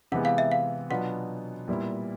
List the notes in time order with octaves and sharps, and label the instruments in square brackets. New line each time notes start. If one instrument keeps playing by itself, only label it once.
[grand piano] C3 E3 G#3 B3 [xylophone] F#5
[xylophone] F5
E5
F5
[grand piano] B2 F#3 B3 D4 F4 [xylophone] F#5
[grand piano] A#2 G3 B3 E4